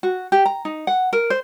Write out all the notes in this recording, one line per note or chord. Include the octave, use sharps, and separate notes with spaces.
F#4
G4
A#5
D#4
F#5
A#4
C5